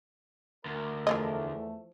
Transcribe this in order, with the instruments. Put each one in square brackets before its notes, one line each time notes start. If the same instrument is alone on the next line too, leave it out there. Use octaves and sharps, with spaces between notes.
[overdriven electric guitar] D2 [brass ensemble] A#4
[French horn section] E2 A3 [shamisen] E3 F3 D#5